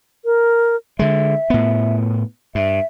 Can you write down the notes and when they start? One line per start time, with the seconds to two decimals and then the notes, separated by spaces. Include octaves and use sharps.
0.25 A#4
0.99 D3 G#3 E5
1.50 A2 B3
2.55 G2 E5